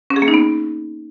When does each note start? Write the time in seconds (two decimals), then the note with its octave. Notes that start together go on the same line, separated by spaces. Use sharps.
0.10 C#4
0.16 G#4
0.22 A#3
0.28 D#4
0.34 B3